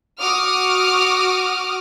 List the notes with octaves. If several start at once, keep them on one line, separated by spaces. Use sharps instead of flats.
F#4 D6 D#6 F6